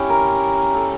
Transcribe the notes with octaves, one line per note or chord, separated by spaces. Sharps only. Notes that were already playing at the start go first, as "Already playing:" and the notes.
Already playing: C#4 E4 G4
A#4
A4